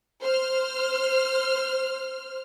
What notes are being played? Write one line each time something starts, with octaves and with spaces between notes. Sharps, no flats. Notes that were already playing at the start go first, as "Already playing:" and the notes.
C5 F6